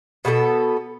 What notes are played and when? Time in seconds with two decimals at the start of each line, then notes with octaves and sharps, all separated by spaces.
0.25 B2 B3 F#4 A4